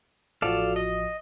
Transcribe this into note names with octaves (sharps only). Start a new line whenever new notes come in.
A1 F3 F#4 A4 D5 F5
D#5